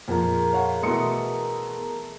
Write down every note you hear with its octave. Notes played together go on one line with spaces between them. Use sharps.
F2 A#2 G#4 A#4 A#5
C#5 F5 F#5
B2 E3 A3 C6 D#6 C#7